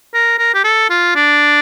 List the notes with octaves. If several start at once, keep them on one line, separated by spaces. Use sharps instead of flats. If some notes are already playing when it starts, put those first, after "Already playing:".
A#4
A#4
G4
A4
F4
D4